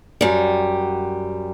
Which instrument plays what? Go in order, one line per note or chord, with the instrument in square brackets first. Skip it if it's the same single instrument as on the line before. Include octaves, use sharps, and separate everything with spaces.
[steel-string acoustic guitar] F#2 G3